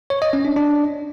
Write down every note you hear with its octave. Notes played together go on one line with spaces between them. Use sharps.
C#5
D#5
C#4
D4
D4